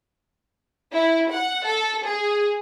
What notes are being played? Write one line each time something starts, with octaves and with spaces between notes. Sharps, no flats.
E4
F#5
A4
G#4